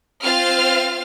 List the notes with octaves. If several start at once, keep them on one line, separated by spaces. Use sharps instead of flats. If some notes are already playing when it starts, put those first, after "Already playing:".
C4 F4 C5 F5 F6 A6